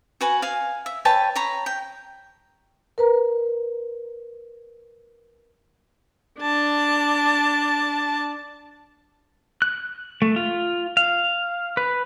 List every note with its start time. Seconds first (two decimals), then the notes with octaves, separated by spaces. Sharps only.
0.21 F#4 B4 G#5
0.42 F5 G#5
0.86 E5
1.05 B4 C#5 G5 A5
1.36 C#5 A#5 B5
1.66 G5
2.98 A#4 B4 A#5
6.40 D4 A5
9.62 F#6
10.22 A3
10.36 F4
10.97 F5
11.77 B4